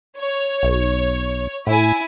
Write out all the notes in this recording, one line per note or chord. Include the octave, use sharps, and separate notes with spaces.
C#5
B1
A2 E4 G#5